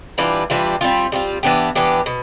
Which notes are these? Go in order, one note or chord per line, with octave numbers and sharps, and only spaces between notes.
E3 G3 D4 F4
E3 G3 D4 F4
G3 C4 F4
G3 C4 F4
E3 B3 D4 G4
E3 B3 D4 G4
B2